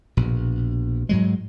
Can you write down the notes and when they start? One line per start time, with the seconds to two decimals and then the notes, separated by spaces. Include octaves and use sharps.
0.17 A#1 B2
1.09 G#2 F#3 G#3